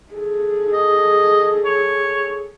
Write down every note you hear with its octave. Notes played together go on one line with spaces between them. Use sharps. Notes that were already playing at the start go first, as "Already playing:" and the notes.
G#4 A4
D#5
C#5